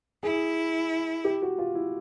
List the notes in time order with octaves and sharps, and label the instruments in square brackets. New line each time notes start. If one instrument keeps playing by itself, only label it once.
[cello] E4 [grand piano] G#4
[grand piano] G4
F#4
F4
E4